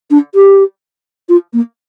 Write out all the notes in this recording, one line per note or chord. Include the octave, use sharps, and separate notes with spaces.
D4
G4
F4
A#3